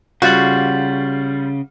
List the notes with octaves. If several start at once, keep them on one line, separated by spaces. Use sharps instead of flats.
C#3 G3 F4 F#4 G6 A6 F#7